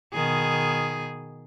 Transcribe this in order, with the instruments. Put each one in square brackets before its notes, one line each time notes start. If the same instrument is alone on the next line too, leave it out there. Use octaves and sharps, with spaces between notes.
[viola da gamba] B2 D#3 G#4